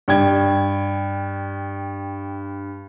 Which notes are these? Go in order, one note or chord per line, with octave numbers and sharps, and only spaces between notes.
G2 G5 G#6